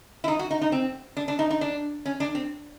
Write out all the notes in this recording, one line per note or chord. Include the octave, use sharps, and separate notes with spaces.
E4
D#4
F#4
D#4
D#4
C4
D4
D4
D#4
D#4
D4
C#4
D4
C4